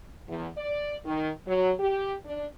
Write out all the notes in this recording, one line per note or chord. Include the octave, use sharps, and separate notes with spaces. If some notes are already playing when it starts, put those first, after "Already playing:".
E2
D5
D#3
F#3
G4
D4